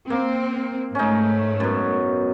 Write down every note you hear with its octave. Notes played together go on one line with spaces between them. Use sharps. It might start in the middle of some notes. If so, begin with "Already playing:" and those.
A#3 C4
G#2 A3 C#4 D#4
F#2 B2